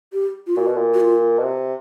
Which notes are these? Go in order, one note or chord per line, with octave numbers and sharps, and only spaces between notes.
G4
F4
A#2 F#4
B2
A#2
F#4
F4
B2
C3